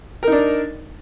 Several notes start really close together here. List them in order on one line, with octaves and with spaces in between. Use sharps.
A#4 D#4 D4